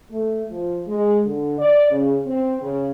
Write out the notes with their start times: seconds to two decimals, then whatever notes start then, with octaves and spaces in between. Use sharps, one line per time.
0.11 A3
0.50 F3
0.87 G#3
1.25 D3
1.58 D5
1.91 C#3
2.26 C4
2.61 C#3